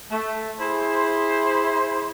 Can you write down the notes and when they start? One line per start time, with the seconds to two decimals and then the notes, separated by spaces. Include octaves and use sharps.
0.11 A3
0.60 E4 G#4 C5